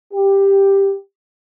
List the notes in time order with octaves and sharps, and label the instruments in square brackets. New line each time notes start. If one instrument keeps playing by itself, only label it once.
[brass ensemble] G4